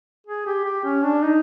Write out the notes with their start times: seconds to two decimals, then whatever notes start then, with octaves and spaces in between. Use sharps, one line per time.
0.27 G#4
0.46 G4
0.65 G4
0.85 C#4
1.03 D4
1.23 D#4